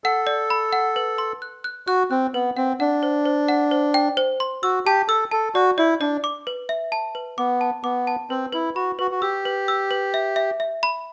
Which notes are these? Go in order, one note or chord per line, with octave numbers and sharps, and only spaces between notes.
A4 F#5
D5
B5
F#5
B4
C6
F#6
F#6
F#4 F#6
C4 F#6
B3 B4
C4 F#5
D4 F#5
C5
C5
F#5
C5
G5
C5
C6
F#4 E6
G4 A5
A4 E6
A4 A5
F#4 D5
E4 D5
D4 D5
D6
B4
E5
A5
B4
B3 D6
A5
B3 D6
A5
C4 B4
E4 B4
F#4 B5
F#4 B4
F#4
G4 E6
B4
E6
B4
E5
E5
E5
B5